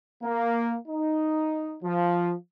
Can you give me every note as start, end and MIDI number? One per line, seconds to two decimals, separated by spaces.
0.23 0.75 58
0.88 1.74 63
1.83 2.33 53